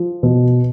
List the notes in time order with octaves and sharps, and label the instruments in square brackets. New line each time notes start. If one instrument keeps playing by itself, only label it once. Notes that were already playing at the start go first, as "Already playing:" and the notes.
Already playing: [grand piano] F3
B2